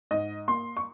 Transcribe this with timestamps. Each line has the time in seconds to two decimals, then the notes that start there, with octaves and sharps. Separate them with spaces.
0.11 G#2 D#5
0.48 A#3 C6
0.77 C#6